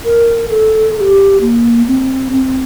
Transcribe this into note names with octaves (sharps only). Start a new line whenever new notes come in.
A#4
A4
A4
G4
A#3
C4
C4